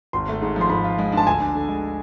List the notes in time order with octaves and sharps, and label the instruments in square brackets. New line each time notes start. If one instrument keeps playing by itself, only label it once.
[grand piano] G#1 [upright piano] C6
[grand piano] A3
G#2
F3
[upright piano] C6
[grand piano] G#2 [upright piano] B5
[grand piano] F4
G#3
D4
[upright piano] A5
[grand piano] D2 [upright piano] G#5
[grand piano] D4
D3
G#3